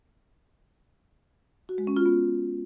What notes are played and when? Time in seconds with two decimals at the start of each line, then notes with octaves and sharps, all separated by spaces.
1.69 F#4
1.78 G#3
1.87 C#4
1.96 F4
2.06 B3